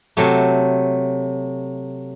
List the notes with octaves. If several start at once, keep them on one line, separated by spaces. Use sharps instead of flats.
C3 F#3 A3